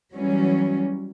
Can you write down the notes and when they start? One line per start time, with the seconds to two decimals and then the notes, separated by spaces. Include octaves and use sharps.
0.14 E3 F#3 G3 C#4